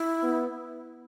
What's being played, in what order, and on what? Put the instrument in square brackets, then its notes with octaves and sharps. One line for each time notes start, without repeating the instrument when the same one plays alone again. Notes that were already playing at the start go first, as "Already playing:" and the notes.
Already playing: [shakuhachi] E4
[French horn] B3